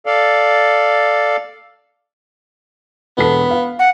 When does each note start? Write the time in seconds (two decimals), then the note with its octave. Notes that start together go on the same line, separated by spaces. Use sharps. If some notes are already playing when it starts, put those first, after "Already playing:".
0.06 A4 D5 F5
3.18 E1 B3 A4 B6
3.51 F5
3.79 F#5